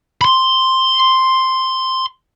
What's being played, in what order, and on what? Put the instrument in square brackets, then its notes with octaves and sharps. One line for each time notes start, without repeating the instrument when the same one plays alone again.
[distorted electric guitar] B5 C6